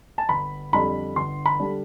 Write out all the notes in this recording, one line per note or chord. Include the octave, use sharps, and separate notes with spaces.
A5
G1 B5
F2 D3 G3 D4 B5
G1 C6
B5
D3 G3 D4